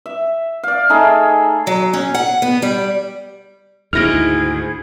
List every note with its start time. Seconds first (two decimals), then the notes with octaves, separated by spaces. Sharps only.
0.06 E5
0.63 D5 F5
0.89 A3 D#4 G#4 A4
1.67 F#3
1.94 C#4
2.15 F#5
2.42 B3
2.62 G3
3.93 D2 G#2 D#3 E4 G#4 F6 A#6 D7